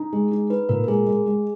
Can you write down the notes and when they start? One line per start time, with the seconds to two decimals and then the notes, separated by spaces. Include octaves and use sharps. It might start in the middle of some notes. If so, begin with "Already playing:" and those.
Already playing: D#4
0.13 G#3 G#4
0.31 D#4
0.50 D#4 B4
0.69 A#2 A#4
0.84 A#4
0.88 G#3 G#4
1.07 G#3
1.26 G#3